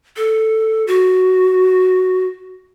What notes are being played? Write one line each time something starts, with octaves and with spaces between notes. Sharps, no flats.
A4
F#4